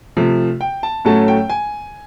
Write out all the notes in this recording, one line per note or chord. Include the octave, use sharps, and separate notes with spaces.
C3 F3 A3
G5
A5
A2 F#3 A3 C#4 A5
G5
G#5